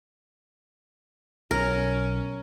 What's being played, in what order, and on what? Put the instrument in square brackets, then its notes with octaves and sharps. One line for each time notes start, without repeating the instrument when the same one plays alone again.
[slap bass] B1 [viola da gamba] C#4 [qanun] A#4